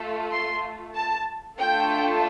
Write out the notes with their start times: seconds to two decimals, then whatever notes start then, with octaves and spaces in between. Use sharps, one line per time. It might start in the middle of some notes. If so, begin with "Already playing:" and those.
Already playing: A3 F4 A4
0.31 C6
0.95 A5
1.58 A3 D4 F4 A4 G5